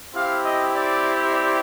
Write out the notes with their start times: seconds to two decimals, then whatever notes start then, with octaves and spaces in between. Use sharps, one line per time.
0.13 C4 E4 G4 F5
0.42 D#5
0.71 D5
1.29 D5